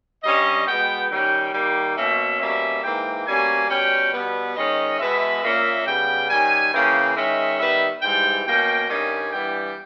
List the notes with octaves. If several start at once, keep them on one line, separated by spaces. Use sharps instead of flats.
G2 G3 C#4 D#5
B2 G#3 B3 G5
D#3 G3 C#4 G5
D#3 G3 A#3 G5
B2 A#3 C#4 E5
B2 G3 A#3 C#4 E5
G#2 E3 A#3 G5
B2 G3 A#3 C#4 G#5
B2 G3 C#4 G5
B2 G3 B3
D#3 G#3 C#4 D#5
B2 G#3 B3 E5
A#2 A#3 C#4 E5
C#3 G3 B3 G5
D#3 G3 A#3 C#4 G#5
C#3 E3 A#3 C#4 G5
D#3 G#3 C#4 E5
D#3 G3 B3 E5
G#2 E3 G3 G5
B2 A#3 C#4 G5
G2 D#3 G3 C#4 G#5
G2 E3 G3 B3 G5